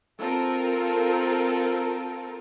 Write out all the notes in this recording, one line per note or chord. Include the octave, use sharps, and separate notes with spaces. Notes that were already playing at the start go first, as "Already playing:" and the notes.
C4 F4 A4 A#4